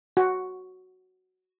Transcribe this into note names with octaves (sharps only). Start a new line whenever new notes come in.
F#4